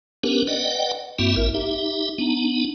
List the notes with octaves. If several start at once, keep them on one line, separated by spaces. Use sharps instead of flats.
B3 C#4 D4 G4 A#4 B4
B4 D5 D#5 F#5 G5
G2 A#3 C4 E4 F#4 E5
A1 E4 A#4 E5
D#4 G4 E5
B3 D4 D#4